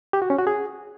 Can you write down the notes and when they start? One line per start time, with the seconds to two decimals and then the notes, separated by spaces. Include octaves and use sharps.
0.13 G4
0.22 F#4
0.30 C#4
0.38 F#4
0.47 G#4